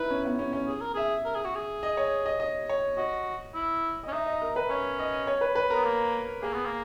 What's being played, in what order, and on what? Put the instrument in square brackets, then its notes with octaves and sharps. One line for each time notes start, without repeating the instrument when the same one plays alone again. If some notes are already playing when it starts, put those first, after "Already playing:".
Already playing: [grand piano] D#4 E4 [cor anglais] B4
[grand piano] C#4
B3
C#4
C#4
[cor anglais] G#4
A#4
[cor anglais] G#4 [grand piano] E5
[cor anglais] A#4
G#4
F#4
G#4
[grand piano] D#5
C#5
D#5
D#5
C#5
[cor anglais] F#4 [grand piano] D#5
[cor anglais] E4
[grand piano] D#5
[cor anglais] C#4
[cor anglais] D#4 [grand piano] E5
[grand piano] D#5
A#4
B4
[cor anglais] C#4 [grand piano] C#5
[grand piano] D#5
C#5
B4
B4
[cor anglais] B3 [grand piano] A#4
[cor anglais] A#3
[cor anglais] A#3 [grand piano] G#4
[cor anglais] B3
A#3